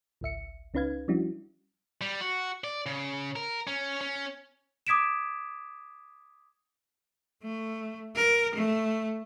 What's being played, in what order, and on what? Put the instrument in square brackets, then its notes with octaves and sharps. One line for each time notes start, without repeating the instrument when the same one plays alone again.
[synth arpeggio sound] G#1 C#2 E5 C#7
C#2 C#4 D#4 B4 F5 G#6
F3 G3 C#4 D4 E4 F#4
[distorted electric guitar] G3
F#4
D5
C#3
A#4
C#4
C#4
[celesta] D6 D#6 G#6 B6 D7 E7
[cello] A3
A#4
A3